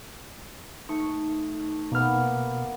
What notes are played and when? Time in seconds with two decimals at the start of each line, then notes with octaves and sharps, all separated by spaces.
0.89 A3 D#4 C#6
1.92 B2 A#3 B3 F6